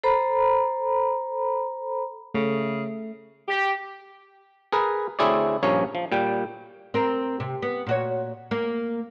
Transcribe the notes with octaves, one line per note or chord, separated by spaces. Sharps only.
A4 C5 A#5 B5
C#3 A3
G4
G#4 A#4 B4
D2 C4 E4 G#4 C#5 D5
A#1 G2 F3 C#4 A#4 C#5
F3
A#2 G3 G5
C4 A#4
C3
B3
A#2 F#4 C#5
A#3